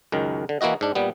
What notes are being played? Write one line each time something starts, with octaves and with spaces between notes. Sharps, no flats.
C#2 F#2 D#3
D3
E3 A#3 E4 F#4 D#5
G#2 D4
A#2 G3 B3